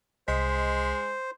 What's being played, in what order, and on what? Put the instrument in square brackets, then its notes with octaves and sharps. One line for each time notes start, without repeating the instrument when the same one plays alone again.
[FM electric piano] C2 D#5 B6 [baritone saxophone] G#3 [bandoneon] C5